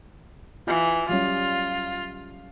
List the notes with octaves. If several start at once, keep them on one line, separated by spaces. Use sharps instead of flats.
E3 F4
F#3 G3 C#4 F4